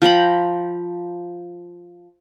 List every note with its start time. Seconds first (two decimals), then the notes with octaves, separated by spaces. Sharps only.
0.02 F3 G5 A#5 B5